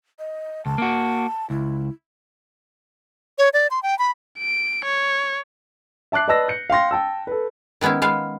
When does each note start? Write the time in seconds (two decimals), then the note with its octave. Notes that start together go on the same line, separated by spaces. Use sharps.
0.19 D#5
0.66 C#2 A5
0.78 A#3 F#4
1.50 C#2 E4
3.38 C#5
3.53 D5
3.71 C6
3.83 G5
3.99 B5
4.39 D7
4.85 C#5
6.12 E5 A5 D6 F#6 C7
6.28 B4 D5 D#5 A5 E6 A#6
6.48 G6 C#7
6.70 F5 G5 C6 A#6
6.91 G5 A5 E6
7.27 A4 B4
7.81 D#3 G#3 B3 C#4 E4
8.02 G#3 B3 F5